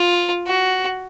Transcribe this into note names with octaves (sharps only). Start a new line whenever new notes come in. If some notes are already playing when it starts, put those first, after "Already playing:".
Already playing: F4
F#4